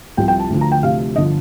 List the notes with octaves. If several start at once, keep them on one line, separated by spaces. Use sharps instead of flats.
C2 C3 F3 G5
G5
A5
D2 D3 F3
A#5
G5
D2 C3 F3 F5
G1 D3 F3 D#5